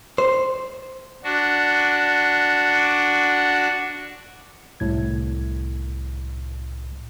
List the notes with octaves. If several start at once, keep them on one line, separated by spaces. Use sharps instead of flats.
C5
D4 F#4
C2 A2 G#6